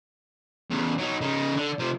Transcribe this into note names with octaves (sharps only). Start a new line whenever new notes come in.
E2 C#3
F#3 D#4
C#3 D#4
D3
C3 F3